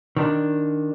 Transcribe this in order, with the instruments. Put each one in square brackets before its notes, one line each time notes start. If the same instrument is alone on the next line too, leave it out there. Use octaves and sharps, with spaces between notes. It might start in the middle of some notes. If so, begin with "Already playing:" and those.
[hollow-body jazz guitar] D#3 D4